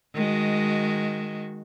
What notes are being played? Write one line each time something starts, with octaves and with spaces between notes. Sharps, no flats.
D#3 G#3 F#4